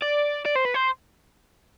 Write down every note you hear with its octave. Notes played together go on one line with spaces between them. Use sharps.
D5
D5
C5
B4
C5